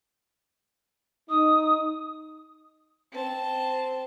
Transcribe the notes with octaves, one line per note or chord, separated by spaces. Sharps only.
D#4 D#6
C4 A5